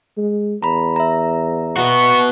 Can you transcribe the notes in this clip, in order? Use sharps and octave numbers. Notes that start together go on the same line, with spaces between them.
G#3
E2 A#5 B5
E5 A#5
B3 F#4 C#6